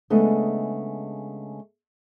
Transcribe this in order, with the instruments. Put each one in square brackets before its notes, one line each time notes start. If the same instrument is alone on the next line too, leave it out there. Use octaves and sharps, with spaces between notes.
[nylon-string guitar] C#3 G#3 A3 B3 D4 D#5